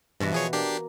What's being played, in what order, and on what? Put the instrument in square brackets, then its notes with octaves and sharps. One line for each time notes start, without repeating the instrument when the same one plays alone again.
[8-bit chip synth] G2 [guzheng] B2 E3 F#4
[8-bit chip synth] F3 G#4 C#5
[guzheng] A#3 [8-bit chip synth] D4 G4 C7